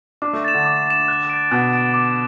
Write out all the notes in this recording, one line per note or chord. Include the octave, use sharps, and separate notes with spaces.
D4 D6
A3
A6 E7
D3
D6
A6 E7
F#6
A6 D7
B2 F#6
A6 D7
D6